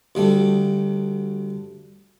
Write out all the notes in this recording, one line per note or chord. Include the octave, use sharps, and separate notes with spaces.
D2 G3 A3